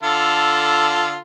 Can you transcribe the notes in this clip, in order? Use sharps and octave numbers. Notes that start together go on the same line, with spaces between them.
D3 F4 A4